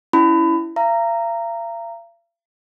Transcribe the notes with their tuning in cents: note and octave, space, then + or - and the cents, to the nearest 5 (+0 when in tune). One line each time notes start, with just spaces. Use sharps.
C#4 +20 E4 +0 B5 +25
F5 -45 A#5 -10